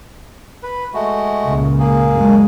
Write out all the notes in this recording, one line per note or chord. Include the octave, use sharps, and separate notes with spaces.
B4
G#3 A3 F#4
C#2 A#2 C#3
A#3 G#4
F#2 G#3